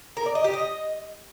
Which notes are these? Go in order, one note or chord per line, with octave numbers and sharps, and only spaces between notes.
A#4
D5
D#5
G4
D#5